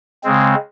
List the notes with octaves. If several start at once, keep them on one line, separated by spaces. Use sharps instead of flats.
C#3 G#3 C4